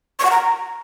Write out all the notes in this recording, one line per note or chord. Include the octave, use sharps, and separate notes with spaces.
C#6
F#5
A#5